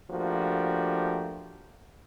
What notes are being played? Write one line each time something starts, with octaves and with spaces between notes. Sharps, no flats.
F3 A3 A#3 D4 F#4 G4